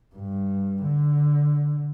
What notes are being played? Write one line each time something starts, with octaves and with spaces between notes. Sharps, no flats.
G2
D3